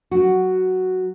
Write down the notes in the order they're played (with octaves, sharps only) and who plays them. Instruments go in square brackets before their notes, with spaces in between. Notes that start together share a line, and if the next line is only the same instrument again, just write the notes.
[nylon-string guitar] F#3 F#4